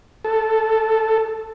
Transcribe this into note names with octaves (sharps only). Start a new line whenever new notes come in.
A4